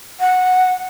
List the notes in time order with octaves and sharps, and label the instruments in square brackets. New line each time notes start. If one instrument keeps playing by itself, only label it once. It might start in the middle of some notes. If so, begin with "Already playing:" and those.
[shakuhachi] F#5